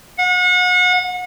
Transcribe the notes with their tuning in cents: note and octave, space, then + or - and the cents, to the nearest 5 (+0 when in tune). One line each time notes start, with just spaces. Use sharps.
F#5 -35